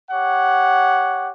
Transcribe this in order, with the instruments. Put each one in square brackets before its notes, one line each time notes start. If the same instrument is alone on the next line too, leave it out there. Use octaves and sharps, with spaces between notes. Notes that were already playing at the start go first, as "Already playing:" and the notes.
[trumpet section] G4 C#5 F#5